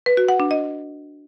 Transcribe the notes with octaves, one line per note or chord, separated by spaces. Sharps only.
B4
F#4
F#5
D4
D#5